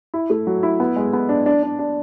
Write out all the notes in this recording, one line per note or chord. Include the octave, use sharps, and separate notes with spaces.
E4
A3
F#3
E4
B3
G#3
B3
D4
D4
D4
D4